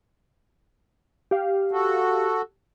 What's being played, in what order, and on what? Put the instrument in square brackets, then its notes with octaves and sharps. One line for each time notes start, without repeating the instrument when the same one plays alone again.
[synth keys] G4 F5
[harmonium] F#4 A4